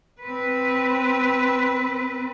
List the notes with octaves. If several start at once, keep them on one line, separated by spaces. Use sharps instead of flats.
C4 B4